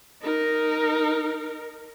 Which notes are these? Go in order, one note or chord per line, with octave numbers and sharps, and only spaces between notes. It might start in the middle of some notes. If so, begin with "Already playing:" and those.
D#4 A#4